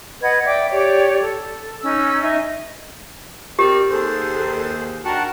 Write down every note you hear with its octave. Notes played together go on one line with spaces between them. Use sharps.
B4 D#5 F#5 G#6
D5 E5 G5 D6
G4 C#5 D5 D6
A4
C#4 D#4 E6
D#4 D#5 E5
C4 G4 A#4 D5
D#2 G#4 A4 C5 C6
D#3 D4 F#4 A#4 F#5 G5 A5